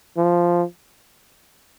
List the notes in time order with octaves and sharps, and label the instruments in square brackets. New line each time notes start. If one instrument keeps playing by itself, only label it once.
[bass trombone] F3